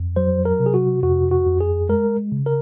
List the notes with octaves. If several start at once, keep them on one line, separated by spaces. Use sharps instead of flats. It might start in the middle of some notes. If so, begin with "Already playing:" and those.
Already playing: F2
F#3 C5
A#4
C3
G#4
F#4
F2 F#4
F#4
F2
G#4
G#3 A#4
C#3
A#4